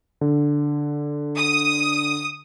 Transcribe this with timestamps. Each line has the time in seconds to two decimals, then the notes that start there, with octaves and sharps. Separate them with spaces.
0.21 D3
1.37 D#6